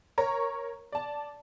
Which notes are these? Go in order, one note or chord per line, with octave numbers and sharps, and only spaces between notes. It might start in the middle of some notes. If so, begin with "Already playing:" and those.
A#4 C#5 A#5 C#6
D5 A5